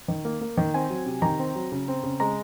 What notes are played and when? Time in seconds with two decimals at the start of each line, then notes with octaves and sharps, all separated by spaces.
0.08 D#3
0.25 A#3
0.41 A#3
0.57 D#3
0.74 C4 G#5
0.90 F#3
1.06 C3
1.22 D#3 A#5
1.39 C4
1.56 F#3
1.72 C#3
1.88 C4
2.03 C#3
2.20 G#3 A#5